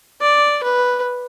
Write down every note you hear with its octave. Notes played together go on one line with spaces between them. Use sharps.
D5
B4